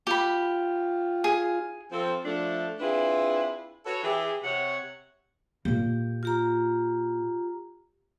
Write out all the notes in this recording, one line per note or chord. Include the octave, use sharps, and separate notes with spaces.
F4 G4 B5
G#4
F3 C4 A4
F3 A3 D4
C4 D4 E4 F4 G#4 B4
F#4 A4 B4 C#5
E3 G4 G#4
C3 C#5 F#5
A#2 A#3 G4
F4 G4 A#5